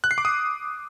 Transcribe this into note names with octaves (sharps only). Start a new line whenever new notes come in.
F#6
C7
D6
D#6